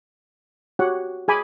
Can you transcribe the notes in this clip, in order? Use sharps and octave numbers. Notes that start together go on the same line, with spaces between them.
F#4 G4 C#5 F#5
G#4 G#5 B5 D6